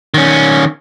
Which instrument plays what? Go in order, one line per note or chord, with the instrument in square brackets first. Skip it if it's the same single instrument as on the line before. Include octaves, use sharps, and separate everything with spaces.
[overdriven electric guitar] D#3 C#4